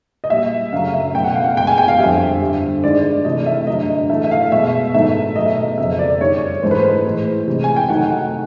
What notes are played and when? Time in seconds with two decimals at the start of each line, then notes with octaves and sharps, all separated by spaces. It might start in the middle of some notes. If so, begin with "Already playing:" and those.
0.24 D#5
0.30 A#2 G3 E5
0.73 F#2 C#3 F#3 A3 F5
0.94 E5
1.15 B2 F#3 A3 G5
1.24 F#5
1.35 F5
1.44 F#5
1.57 B2 G#3 G5
1.67 G#5
1.78 G5
1.88 F5
1.99 F2 D3 G3 E5
2.41 G2 D3 G3
2.83 G2 D#3 G#3 D5
3.04 D5
3.25 C3 E3 A3 D#5
3.46 E5
3.67 G2 D3 F#3 A3 D#5
3.89 D#5
4.10 A2 E3 A3 E5
4.24 E5
4.31 F5
4.52 B2 G#3 E5
4.94 G#2 D#3 F#3 A3 E5
5.36 B2 F#3 A3 D#5
5.46 E5
5.56 D#5
5.78 F2 C#3 F#3 A3 E5
5.99 D5
6.20 F#2 D#3 G3 C#5
6.63 G#2 E3 A3 C5
6.71 B4
6.79 C5
7.05 A2 E3 G#3
7.48 C3 E3 G#3
7.64 G#5
7.76 G5
7.89 C3 D#3 F#3 A3 F#5
8.10 F#5